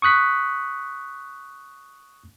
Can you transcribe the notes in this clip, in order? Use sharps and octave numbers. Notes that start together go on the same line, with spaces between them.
C#6 D#6 F#6 B6